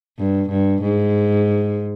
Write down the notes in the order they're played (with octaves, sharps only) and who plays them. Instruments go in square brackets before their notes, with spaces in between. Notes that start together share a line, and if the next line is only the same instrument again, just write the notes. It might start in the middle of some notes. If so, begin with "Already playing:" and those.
[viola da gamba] G2
G2
G#2